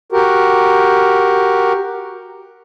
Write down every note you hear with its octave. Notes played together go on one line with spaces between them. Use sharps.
F#4 G4 A#4